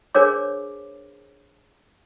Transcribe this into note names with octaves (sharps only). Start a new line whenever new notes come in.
D4 G#4 A#4 C5 C#5 D6